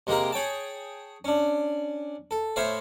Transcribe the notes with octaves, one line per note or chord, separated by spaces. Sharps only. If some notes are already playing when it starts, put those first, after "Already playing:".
C3 G#3 A#3 G4 A#4
G#4 C#5 G5 A5
C#4 D4
A4
A2 C5 C#5 E5 F5